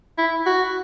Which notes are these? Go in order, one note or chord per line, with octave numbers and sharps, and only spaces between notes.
E4
F#4